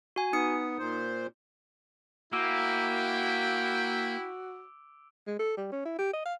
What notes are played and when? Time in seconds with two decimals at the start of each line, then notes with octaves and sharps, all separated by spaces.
0.16 F#4 G#5
0.33 B3 D#4 D#6 C#7
0.79 A#2 C5
2.33 A#3 E4 F#4 G5 D6 E6 D7
5.27 G#3
5.39 A4
5.58 G3
5.72 C#4
5.85 E4
5.99 G4
6.13 D#5
6.26 F5